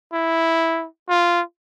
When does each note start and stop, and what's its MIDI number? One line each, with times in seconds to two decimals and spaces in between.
0.13 0.87 64
1.09 1.42 65